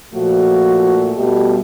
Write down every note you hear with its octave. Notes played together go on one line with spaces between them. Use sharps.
A#2 F3 A3 F#4
B2 G3 A3 G4